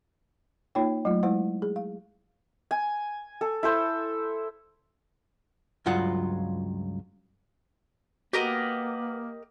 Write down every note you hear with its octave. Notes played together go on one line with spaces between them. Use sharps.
A#3 D#4 F4 C#5 G5
F#3 A3 F4
G#3 E4 C5 F#5
G#4
F5
G#5
A4
E4 A4 C5
C#2 G2 F#3 F4 F#5
A#3 F#4 G4 A#4 B4 D#5 F#5